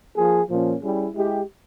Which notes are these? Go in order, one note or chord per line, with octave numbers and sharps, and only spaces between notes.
F3 A#3 F4 G#4
A#2 F3 A#3 C#4
G3 C#4 E4 G#4
G#3 E4 G4